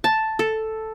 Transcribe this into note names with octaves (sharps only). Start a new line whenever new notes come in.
A5
A4